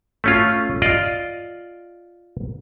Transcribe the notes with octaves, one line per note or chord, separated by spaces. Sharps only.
A3 C#4 F4
F4 D5 D#5